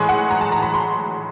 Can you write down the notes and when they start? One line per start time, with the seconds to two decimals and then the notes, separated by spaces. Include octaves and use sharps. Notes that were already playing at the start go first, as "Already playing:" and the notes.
Already playing: A2 E3 G#3 G#5
0.09 F#5
0.31 A#5
0.41 A5
0.52 A#5
0.62 B5
0.74 C6